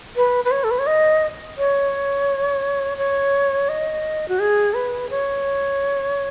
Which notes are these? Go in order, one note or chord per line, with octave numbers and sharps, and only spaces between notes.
B4
B4
C#5
A4
B4
C#5
D#5
C#5
C#5
D#5
F#4
G#4
B4
C#5